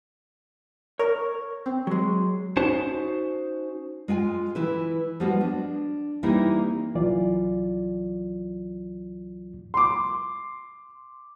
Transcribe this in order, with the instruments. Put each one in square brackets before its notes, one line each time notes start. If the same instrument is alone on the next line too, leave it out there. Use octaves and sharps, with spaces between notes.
[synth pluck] A#4 [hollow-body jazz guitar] C#5
[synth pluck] C4
[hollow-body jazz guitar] F#3 G#3
[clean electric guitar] C#4 D#4 F#4 C5 A5
[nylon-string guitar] G#3 F4 G5 G#5
E3 E4 B4
F3 G3 G#3 B3 F#4
D4
E3 G3 A#3 C4 D#4 E4
[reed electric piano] C2 E3 F#3 F4 D5
[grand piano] C6 D6